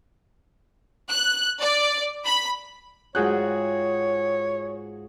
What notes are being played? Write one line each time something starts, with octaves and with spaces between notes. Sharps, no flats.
F#6
D5
B5
G#2 F4 F#4 G#4 C#5 G5 F#6